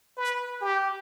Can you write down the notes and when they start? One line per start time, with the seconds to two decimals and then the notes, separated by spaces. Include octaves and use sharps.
0.17 B4
0.62 G4